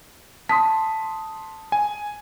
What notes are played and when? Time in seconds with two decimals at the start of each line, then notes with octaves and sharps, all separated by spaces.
0.49 A5 C6 D#6 B6
1.72 G#5